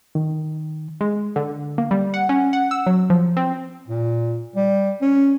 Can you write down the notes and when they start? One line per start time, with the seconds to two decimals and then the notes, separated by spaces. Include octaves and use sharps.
0.15 D#3
1.01 G#3
1.36 D3
1.78 A#3
1.91 G3
2.14 F#5
2.29 C#4
2.53 F#5
2.71 E6
2.87 F#3
3.10 F3
3.37 C4
3.88 A#2
4.56 G3
5.02 C#4